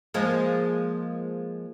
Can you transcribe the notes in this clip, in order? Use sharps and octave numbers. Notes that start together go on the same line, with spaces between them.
F3 G#3 A#3